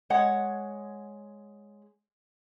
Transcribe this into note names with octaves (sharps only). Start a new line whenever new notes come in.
G#3 C#5 F#5